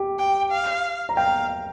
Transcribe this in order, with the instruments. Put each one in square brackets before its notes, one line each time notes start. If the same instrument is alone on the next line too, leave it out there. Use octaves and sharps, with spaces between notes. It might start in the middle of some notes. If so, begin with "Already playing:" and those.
Already playing: [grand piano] G4
[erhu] G5
F5
[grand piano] A#5
[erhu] F5 [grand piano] G5